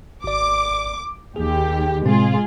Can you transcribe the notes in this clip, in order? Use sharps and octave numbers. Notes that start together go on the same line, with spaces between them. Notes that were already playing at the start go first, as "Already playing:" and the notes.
G#1 D5 D6
D#2 G4 G#4
A2 C3 G#3 C4 F4 G#4